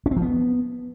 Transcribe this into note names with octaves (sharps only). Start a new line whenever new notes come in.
C#4
C4
F3
B3